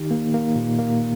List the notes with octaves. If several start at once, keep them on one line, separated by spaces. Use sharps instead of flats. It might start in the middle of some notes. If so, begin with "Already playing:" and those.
Already playing: D#3 D#4 G4
A#3
A#3
A#2
A#3